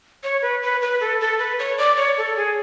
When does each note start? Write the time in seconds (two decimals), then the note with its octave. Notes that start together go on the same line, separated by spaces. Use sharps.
0.24 C#5
0.42 B4
0.62 B4
0.82 B4
1.01 A4
1.21 A4
1.39 B4
1.59 C#5
1.78 D5
1.97 C#5
2.18 A4
2.36 G#4